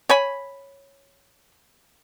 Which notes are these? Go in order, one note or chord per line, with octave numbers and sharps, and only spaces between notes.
C#5 G#5 B5